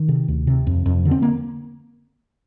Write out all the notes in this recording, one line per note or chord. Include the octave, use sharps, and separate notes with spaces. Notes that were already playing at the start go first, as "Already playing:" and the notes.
Already playing: D#3
C3
D2
C3
F2
F2
D3
C4
A#3